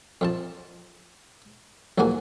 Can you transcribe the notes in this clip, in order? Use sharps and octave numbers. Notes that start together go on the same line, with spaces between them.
F2 F3 A5
B1 E2 F3 A#3 F#4 G#5